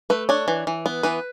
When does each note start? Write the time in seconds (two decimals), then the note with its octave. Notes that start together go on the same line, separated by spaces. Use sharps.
0.10 A3 B4
0.29 D4 C#5
0.48 E3
0.67 E3
0.86 B3
1.03 E3 B4